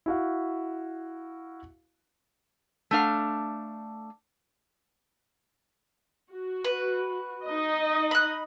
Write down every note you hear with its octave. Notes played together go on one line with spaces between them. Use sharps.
E4 F#4 F5
A3 D4 F5
F#4
B4
D#4 D#5
B5 F#6